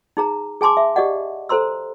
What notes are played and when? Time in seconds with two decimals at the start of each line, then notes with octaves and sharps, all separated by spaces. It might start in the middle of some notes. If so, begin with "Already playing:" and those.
0.17 D#4 G#4 A#5
0.61 G#4 G#5 A5 C6 D6
0.77 E5
0.96 G4 D5 D#5 F#5
1.49 A4 C5 A#5 C6 E6